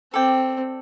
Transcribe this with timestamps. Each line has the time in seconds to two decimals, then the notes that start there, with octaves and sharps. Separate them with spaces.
0.13 C4 A4 D5 G5